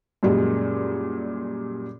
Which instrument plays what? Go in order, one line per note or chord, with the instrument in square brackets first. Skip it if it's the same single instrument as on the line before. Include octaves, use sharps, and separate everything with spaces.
[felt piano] F#2 A#2 G3 G#3